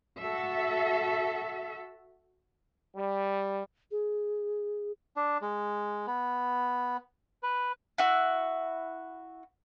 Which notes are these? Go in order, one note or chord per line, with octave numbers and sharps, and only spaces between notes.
F#4 A4 E5
G3
G#4
D4
G#3
B3
B4
E4 F#4